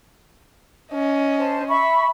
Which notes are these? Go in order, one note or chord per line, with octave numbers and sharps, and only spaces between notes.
C#4 D#5
C5 A5
E5 B5 C#6